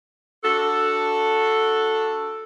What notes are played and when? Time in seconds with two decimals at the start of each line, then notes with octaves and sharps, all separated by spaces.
0.43 D4 F#4 A4